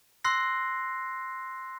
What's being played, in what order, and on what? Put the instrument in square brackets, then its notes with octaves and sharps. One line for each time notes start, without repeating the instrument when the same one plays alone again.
[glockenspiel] C6 E6 F#6 A#6 C7